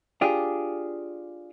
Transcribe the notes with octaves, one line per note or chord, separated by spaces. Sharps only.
D4 F4 G4 G#4